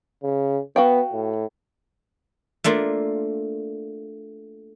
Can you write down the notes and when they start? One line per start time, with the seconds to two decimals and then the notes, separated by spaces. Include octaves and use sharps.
0.23 C#3
0.76 B3 F#4 F5 G5
1.13 A2
2.64 A3 A#3 D4 F4